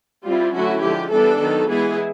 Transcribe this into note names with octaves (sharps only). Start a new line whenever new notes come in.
G3 C4 E4 F4
D3 F#3 A3 C#4 E4 F#4
D3 F3 G#3 G4
E3 G3 B3 D4 A4
D#3 F#3 B3
E3 G#3 B3 E4 G#4